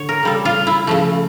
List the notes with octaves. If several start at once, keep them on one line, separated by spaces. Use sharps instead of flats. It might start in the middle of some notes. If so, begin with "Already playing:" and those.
Already playing: D3 C#5
A#4
C#3 G3 A4
F4
E4
C#3 F3 A3